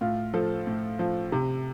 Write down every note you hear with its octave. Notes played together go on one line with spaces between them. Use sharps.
A2 F4
F3 A4
A2
F3
C3